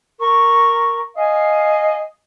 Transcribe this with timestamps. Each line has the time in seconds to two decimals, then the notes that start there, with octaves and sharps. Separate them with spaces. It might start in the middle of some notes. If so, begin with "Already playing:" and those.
0.19 A#4 C#6
1.17 D#5 F5 G#5